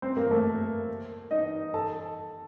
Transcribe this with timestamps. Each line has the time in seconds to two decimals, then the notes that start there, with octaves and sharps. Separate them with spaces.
0.02 C4 C5
0.17 A#3 A#4
0.31 A3 A4
1.31 D#4 D#5
1.74 A4 A5